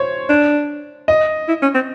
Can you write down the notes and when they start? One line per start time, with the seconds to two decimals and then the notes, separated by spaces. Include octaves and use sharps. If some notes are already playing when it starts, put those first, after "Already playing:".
Already playing: C5 C#5
0.29 D4
1.08 D#5
1.48 E4
1.62 C#4
1.74 C4